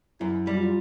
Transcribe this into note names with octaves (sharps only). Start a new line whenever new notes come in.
F#2 E4
G3
F#4
F4